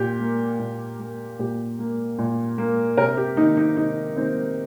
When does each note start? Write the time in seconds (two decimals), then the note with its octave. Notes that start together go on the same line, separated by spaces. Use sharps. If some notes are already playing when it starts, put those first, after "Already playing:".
Already playing: A#2 G4
0.20 A#3
0.59 A#2
0.99 A#3
1.39 A#2 G4
1.79 A#3
2.18 A#2
2.58 A#3
2.97 C3 A#4
3.17 G4
3.37 A#3 D#4
3.41 D#3
3.57 D#4
3.77 C3 D#4
4.16 D#3 A#3 C4